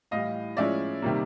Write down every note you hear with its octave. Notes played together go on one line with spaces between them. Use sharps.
A2 E3 G3 D#5 F5
A2 F3 G#3 C#4 E4 D5 E5
C3 D#3 G3 A#3